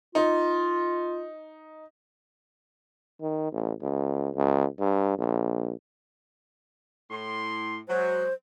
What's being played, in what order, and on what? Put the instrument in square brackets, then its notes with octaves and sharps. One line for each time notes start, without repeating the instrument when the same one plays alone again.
[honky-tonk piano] D#4 [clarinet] F4
[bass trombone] D#3
A1
C#2
C#2
G2
A#1
[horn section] A2 C6
[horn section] F#3 G#3 [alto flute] C5